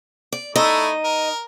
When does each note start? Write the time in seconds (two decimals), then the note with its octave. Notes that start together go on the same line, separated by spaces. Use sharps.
0.32 D5
0.56 A3 D#4 E4 D#5
1.04 A#4